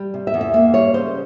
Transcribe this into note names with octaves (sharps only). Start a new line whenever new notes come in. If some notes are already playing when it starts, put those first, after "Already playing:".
Already playing: G3
C3
E5
E2
E5
A#3 E5
G3 C#5
C#3 C5